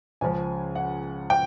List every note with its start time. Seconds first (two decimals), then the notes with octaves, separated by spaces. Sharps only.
0.21 C#2 C#3 F3 G#5
0.75 F#5
1.30 G5